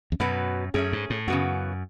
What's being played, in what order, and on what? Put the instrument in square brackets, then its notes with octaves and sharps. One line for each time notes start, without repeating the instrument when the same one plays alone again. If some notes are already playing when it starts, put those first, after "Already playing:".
[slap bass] E2
[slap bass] F#2 [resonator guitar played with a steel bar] B2 F#3 B3
[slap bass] F#2 [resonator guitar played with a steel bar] A3 C#4 G#4
[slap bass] G#2
A2
[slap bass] F#2 [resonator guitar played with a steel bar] C#3 E3 B3 F#4